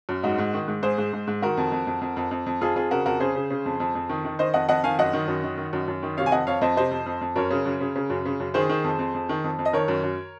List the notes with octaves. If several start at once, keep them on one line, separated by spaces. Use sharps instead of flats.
F#2
G#2 D#4 F#4
G#2
D#3
G#2
G#2 G#4 C5
G#2
G#2
G#2
D#3 F#4 A#4
F2
F2
F2
F2
F2
F2
F2
F2 F4 G#4
F2 F4 G#4
C#3 F#4 A#4
F2 F#4 A#4
C#3 G#4 C5
C#3
C#3
F2
F2
F2
D#3
D#3
D#3 C5 D#5
F2 D#5 F#5
F2 D#5 F#5
D#3 F5 G#5
F#2 D#5 F#5
D#3
F#2
D#3
D#3
F#2
F#2
D#3
C3 C#5 F5
G#5
F2 D#5 F#5
F2 C#5 F5
F2 C5 D#5
C3 C5 D#5
F2
F2
F2
F#2 A#4 C#5
C#3
F#2
C#3
C#3
F#2
C#3
F#2
D#3 G#4 C5
D#3
F2
F2
F2
D#3
F2
F2
D#5
D#3 A#4 C#5
F#2
F#2